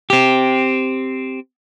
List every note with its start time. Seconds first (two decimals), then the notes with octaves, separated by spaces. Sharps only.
0.10 C4 G4